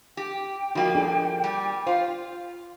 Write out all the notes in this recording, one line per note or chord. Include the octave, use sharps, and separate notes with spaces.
G4 G5
F3 A#3 D#4 F#4 B5
D4 G#4 A4
G3
F4 C5